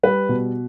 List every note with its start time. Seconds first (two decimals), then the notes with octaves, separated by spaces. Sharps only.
0.03 G3 B4
0.29 B2